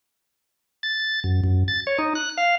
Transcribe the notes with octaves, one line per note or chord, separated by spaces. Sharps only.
A6
F#2
F#2
A6
C#5
D#4
F#6
F5